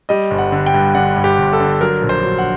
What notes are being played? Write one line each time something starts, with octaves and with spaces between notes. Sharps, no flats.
G3 D#5
G1
F#5
D3
G5
G2
D3 F#5
G2
G4
G1
A4
D3
F#3 A#4
A#1
C5
F#3
F#5